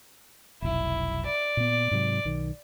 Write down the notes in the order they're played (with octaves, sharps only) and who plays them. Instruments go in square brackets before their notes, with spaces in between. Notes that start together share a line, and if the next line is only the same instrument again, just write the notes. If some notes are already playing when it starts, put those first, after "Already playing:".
[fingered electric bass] F1 B1 [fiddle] E4
[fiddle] D5
[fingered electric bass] A#2 B3
G#2 C3 F#3
B1 D#3